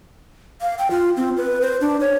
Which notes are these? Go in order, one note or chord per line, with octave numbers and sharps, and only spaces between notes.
F5
G5
F4
C4
B4
C5
D4
C#5